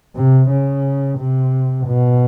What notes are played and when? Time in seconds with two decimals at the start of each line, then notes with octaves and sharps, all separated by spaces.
0.16 C3
0.50 C#3
1.19 C3
1.87 B2